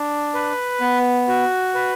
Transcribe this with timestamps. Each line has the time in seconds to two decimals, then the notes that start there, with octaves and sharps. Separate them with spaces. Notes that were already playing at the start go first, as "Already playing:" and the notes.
Already playing: D4
0.35 B4
0.81 B3
1.28 F#4
1.75 B4